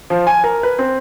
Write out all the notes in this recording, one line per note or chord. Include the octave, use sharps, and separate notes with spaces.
F3
G#5
A#4
B4
C4